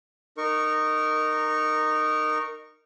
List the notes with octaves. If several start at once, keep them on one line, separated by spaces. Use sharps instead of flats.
D#4 A#4 C#6